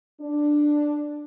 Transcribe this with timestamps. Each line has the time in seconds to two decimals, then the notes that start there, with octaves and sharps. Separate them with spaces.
0.21 D4